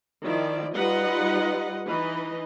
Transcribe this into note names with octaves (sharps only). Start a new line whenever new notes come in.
D#3 F3 E4 D5
G3 D#4 F4 B4 D#5 F#5
E3 D#4 B4 D#5